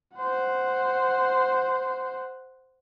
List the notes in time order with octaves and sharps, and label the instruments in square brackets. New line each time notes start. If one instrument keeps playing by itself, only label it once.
[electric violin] C5 F#5